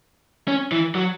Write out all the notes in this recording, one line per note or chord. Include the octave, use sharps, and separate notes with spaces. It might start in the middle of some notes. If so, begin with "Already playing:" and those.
C#4
E3
F#3